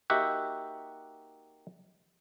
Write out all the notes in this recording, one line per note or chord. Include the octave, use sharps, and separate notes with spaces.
A#3 D#4 F#4 G4 E5 F#5